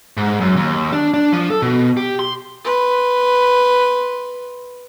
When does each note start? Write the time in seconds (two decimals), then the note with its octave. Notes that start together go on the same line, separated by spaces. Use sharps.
0.17 G#2
0.41 F#2
0.56 D#2
0.93 D4
1.14 D4
1.33 F3
1.50 A4
1.62 B2
1.97 G4
2.19 C6
2.65 B4 C6